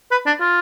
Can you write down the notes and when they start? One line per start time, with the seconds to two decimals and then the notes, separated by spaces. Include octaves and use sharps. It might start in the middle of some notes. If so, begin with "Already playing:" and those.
0.11 B4
0.26 D4
0.40 F4